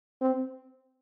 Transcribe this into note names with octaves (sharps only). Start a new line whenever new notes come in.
C4